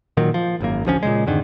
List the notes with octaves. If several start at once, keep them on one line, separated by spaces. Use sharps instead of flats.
A#2 D#3 F#3
F3
G#1 F#2 A#3
A1 D2 F3 C#4
A#2 C#3 G#3
F2 G#2 D3 D#3